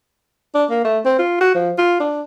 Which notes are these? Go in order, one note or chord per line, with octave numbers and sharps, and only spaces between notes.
D4
A#3
A3
C4
F4
F#4
F3
F4
D4